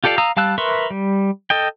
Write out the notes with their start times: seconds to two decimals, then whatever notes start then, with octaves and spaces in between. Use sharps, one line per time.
0.04 F4 G4 A4 D5 F5
0.18 F5 A#5 D#6 E6
0.37 G3 F5 A5 E6 F#6
0.58 A#4 B4 E5 C6 C#6
0.90 G3
1.50 A4 D#5 G5